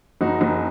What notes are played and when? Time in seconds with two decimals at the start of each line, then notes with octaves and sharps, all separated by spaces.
0.21 F#1 D#4 F#4
0.41 F#1